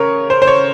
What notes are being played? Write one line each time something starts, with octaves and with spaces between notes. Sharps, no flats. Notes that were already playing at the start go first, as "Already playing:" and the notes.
Already playing: C#3 A#4 C#5
C5
C5
C#5